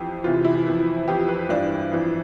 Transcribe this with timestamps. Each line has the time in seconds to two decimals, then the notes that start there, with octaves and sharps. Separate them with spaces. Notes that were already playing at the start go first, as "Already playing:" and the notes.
Already playing: F2 E3 G4
0.24 E2 C3 E3 F4
0.45 E4
0.67 F2 E3
1.07 F2 E3 G4
1.28 B4
1.49 G2 E3 D4
1.92 F2 E3